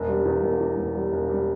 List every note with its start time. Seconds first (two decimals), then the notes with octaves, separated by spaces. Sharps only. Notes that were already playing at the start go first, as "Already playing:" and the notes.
Already playing: E1
0.08 G3
0.25 E2
0.43 E1
0.60 E3
0.77 E1
0.95 G3
1.12 E1
1.29 G3